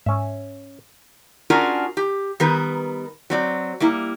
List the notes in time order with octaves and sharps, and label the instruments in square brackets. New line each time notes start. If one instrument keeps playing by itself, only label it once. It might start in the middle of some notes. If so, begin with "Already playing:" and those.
[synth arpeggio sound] G#2 [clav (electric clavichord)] C#4 E5
[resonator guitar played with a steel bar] C#4 D4 F4 F#4 G#4 A#4
G4
D#3 G3 B3 A#4 B4
F#3 C4 D5
G3 A#3 E4